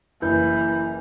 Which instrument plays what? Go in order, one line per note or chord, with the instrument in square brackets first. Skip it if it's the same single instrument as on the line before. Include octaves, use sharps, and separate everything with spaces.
[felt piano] F#1 [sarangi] E3 [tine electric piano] E4 [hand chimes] B4 G6